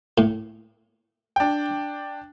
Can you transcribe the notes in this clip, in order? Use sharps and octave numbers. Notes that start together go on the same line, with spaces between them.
A2
D4 G5